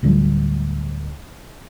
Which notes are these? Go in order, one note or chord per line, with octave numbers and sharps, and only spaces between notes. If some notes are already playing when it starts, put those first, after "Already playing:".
D1 D2 F3 G3